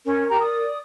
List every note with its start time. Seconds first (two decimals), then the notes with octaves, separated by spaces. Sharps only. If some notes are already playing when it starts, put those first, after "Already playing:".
0.06 C#4 A#4
0.29 G4 A#5
0.41 D5 D#6